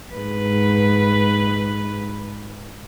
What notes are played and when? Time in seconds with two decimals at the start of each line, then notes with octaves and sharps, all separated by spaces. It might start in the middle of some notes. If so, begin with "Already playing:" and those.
0.14 G#2 B4